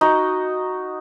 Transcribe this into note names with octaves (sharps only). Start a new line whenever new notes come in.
D#4 F#4